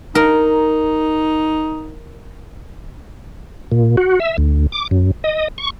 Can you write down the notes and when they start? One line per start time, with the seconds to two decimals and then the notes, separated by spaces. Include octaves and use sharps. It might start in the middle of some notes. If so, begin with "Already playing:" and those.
0.15 D#4 A#4
3.72 A#2
3.97 F#4
4.20 E5
4.38 D2
4.72 D6
4.91 F#2
5.24 D#5
5.58 C#6